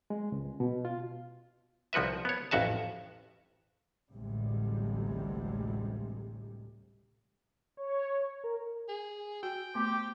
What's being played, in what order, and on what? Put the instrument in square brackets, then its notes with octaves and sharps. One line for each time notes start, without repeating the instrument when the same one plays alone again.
[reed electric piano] G#3
C#2
B2
F4
[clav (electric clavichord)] C2 F3 F#4 B4 E5
B3 C#5
A1 F2 F#4 E5 A5
[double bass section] A1 D2 C3 G3 G#3
[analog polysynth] C#5
A#4
[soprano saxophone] G#4
[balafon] F#4 [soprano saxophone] G5
[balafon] A3 B3 [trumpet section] G4 C5